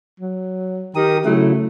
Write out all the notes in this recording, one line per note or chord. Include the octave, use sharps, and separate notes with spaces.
F#3
D#3 G4 A#4 D#6
C#3 F#3 A3 E4